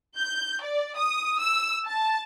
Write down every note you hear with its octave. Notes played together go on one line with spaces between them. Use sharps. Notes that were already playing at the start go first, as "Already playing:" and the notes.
G6
D5
D#6
E6
A5